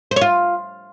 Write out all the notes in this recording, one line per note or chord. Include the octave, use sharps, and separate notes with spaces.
C5
C#5
F4